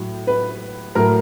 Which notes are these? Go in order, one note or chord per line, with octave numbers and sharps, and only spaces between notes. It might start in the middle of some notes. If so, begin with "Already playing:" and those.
Already playing: A2 F#3
B4
A2 F#3 A#4